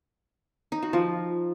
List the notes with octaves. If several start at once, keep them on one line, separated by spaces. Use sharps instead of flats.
D#4
F#4
F3